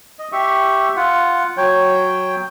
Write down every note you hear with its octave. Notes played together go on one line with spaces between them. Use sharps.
D#5
G4 E5 C#6
F4 F#5
F#3 C#5 G5